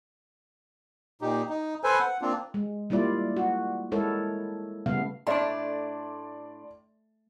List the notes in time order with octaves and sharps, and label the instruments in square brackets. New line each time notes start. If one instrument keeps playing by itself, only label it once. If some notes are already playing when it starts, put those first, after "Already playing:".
[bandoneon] A#2 D#4 G4
D#4
A4 B4 C5 G#5
F#5
A#3 C4 D4 F4
[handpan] G#3
G3 A#3 E4 F4 D5
F#4
G#3 E4 A4 A#4 C#5
C#3 G3 A3 B3 F5
[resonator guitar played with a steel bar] A2 D4 [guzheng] A3 [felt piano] D5 C6